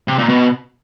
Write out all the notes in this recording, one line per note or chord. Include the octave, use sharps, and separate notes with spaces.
C3
A#2
B2